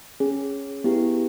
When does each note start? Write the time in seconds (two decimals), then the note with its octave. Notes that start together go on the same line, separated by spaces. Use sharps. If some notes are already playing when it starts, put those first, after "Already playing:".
0.20 C#4 G#4
0.84 B3 E4 G4